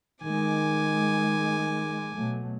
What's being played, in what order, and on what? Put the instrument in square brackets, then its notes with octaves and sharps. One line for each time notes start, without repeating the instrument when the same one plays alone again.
[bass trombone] D#3 [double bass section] G#3 [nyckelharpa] G#5 D6
[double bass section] B2 F#3 A3